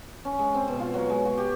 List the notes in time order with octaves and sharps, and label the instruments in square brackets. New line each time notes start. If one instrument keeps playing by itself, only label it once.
[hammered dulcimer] C#4
G#3
C4
B2
F4
F#3
G#3
F#4
G4